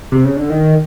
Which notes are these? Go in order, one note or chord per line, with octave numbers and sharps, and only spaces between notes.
C3
C#3
D3
D#3